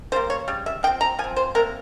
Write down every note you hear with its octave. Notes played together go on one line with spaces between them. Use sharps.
C#3 G3 A#3 C5
C#5
C#3 G3
E5
F3 C4 G5
A#5
F3 G#5
C4
C5
C3 G3 A#3 A#4